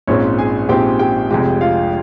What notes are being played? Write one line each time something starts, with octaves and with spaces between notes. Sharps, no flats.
A#1 G#2 F3 C4 C#4 C#5
G#4 G#5
A#1 G#2 F3 C4 G4 G5
G4 G5
F1 F2 C3 F3 G#3 G4 G5
F4 F5